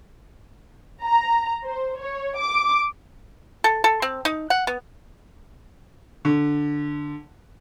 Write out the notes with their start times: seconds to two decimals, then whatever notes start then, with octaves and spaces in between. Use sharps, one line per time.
1.03 A#5
1.66 C5
2.00 C#5
2.38 D6
3.64 A4
3.84 A4
4.02 C4
4.25 D#4
4.50 F#5
4.67 B3
6.25 D3